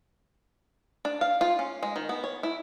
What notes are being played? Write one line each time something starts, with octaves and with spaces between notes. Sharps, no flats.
D4
F5
F4
C#4
G#3
D#3
B3
C#5
E4